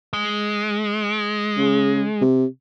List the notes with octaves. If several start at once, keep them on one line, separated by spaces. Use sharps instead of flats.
G#3
C#3
C3